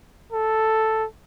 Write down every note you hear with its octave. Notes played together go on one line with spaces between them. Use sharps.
A4